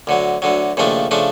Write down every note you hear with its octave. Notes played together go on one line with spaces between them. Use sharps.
D2 D3 F#3
D2 D3 F#3
D#2 C#3 F3 A3 D4
C#3 F3 A3 D4